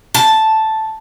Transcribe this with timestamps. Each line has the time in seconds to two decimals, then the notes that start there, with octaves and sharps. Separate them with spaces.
0.15 A5